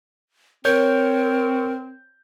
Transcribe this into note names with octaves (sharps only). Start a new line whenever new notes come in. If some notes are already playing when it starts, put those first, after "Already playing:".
C4 A#4 C#5 G6